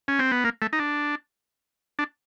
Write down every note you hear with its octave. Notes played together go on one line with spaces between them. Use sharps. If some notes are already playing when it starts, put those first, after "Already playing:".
C#4
C4
B3
A#3
A3
D#4
D4
D4